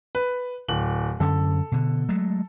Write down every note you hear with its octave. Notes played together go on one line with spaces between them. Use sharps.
B4
D1 F#7
F#2 D3 C#4 A4
B2 D3
F#3 G#3 A3